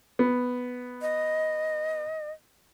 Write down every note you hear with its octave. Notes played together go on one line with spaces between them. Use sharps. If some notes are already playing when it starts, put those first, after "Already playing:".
B3
D#5